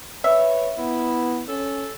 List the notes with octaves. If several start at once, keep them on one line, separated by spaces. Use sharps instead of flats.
B4 C#5 E5
B3 E4
C#4 A4